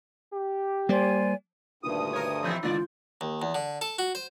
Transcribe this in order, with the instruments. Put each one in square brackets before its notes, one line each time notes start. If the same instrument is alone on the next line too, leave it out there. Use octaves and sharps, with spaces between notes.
[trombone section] G4
[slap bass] G3 A#3 [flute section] C5 D5 G#5
[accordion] D2 G2 D#6 [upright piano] A#2 D#3
[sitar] A#4 C#5
[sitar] B2 E3 C4 [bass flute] F3 [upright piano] B5 G6
[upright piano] A1 G#2 D3 [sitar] D#3 A#3 D5 [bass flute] F4
[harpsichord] D#2
E2
D3
A4
F#4
C5